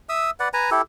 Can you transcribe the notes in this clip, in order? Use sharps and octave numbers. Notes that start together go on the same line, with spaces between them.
E5 D#6 E6
B4 D5 F#5
B4 G#5 A#5
E4 G4 A4